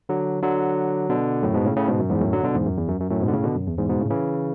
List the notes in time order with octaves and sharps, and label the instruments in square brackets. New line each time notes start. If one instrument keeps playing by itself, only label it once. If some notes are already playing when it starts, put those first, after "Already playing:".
[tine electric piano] D3 F#3
D3 F#3
B2 D3
F#2 A2
G#2 B2
A2 C#3
A2 C#3
G#2 B2
F#2
E2 G#2
F#2 A2
D3 F#3
B2 D3
E2 G#2
F#2
E2
F#2
F#2
F#2 A2
G#2 B2
D3
A2 C#3
B2 D3
F#2
E2
E2 G#2
G#2 B2
A2 C#3
C#3 E3